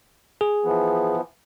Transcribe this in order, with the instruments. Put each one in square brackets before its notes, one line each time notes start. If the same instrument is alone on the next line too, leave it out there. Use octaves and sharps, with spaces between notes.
[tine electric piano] G#4
[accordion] E3 F3 B3